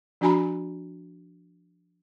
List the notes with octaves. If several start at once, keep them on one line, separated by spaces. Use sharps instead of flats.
F3 D4 F#4 G#5 A#5 B5